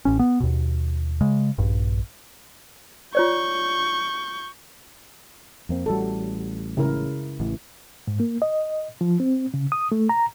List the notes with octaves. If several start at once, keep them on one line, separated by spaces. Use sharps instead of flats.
A1 C#4
B3
D#2 B2
C#3 G#3
A#1 G2
F4 C#5 D5 C#6 G6
F2 A#3 C4
A1 G3 F#4 A4
C#3 E4 A#4
A1 E3
G#2
A#3
D#5
F3
C4
C#3
D#6
A3
A#5